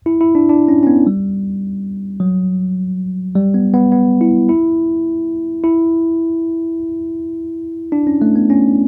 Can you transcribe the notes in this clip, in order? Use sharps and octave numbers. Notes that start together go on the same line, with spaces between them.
E4
E4
D4
D4
C#4
C#4
B3
G3
F#3
G3
B3
B3
B3
E4
E4
E4
D4
C#4
A3
B3
C#4